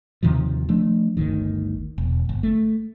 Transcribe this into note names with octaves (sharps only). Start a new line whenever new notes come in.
D#2 C3 D#3 F3
F3 A3 D4
G1 D2 D#3
E1
G1
A3